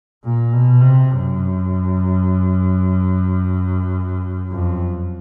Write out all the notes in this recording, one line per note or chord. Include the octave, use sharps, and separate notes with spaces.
A#2
B2
C3
F#2
F2